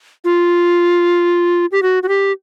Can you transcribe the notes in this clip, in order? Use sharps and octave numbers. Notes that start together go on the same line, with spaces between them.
F4
G4
F#4
F#4
G4